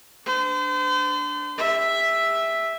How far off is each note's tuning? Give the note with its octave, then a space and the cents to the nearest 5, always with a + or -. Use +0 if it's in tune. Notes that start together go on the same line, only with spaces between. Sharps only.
D4 +0 C5 -40
G4 +45 E5 +0